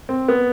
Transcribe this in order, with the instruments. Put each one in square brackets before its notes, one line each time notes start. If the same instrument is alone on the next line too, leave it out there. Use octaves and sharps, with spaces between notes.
[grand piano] C4
B3